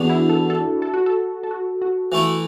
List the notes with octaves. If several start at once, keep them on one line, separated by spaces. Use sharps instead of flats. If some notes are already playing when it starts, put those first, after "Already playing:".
Already playing: E2 D3 B3 D4 F#4
E4
A4
A4
A4
F#4
A4
A4
F#4
F#4
E3 A3 E4 F#4